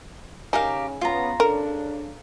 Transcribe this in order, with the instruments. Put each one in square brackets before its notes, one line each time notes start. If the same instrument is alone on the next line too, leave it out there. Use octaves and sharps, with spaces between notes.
[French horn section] C#3 [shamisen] D#4 [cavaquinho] G4 A#4 F5 [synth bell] G#5
[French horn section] C#3 B3 [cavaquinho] F4 A#5
[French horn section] C#3 D4 [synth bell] A4 [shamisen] A#4